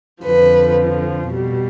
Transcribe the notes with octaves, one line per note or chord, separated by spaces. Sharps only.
F2 D3 F3 B4
B2
G3